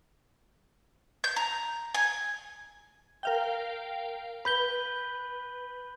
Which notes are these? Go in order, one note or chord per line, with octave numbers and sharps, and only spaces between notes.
G6
A#5
G#5
A#4 F5 G5
B4 B5 G6 G7